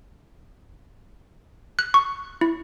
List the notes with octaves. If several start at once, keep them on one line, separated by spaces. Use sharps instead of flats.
F#6
C#6
E4